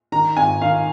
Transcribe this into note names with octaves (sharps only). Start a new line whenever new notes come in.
D#3 A#5
G#1 G#5
D#3 F5